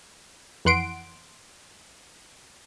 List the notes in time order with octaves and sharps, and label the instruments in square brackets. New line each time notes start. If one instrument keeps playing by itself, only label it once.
[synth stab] F2 E3 F#5 C6 D7